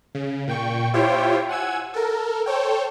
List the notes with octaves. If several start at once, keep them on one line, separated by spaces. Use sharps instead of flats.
C#3
A#2 G5 C#6
E4 F4 G4 C5 C#5 G5
F#5 G#5 E6 G#6
A4 A#4
A4 C5 C#5 G5